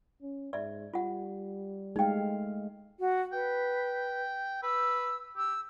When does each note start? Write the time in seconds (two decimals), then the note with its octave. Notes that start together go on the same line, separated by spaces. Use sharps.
0.22 C#4
0.53 G#2 D5 E5
0.93 G3 F4 F#5
1.96 G#3 A3 D#4 F5 G5
3.00 F#4
3.33 B4 G5
4.63 B4 E6
5.37 G4 E6